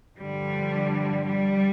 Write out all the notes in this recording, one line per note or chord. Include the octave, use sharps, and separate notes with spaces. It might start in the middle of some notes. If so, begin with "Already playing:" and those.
G2 D3 F3 G3
G3